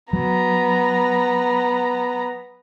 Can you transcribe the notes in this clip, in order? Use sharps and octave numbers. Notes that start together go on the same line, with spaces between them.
F#3 B3 A#5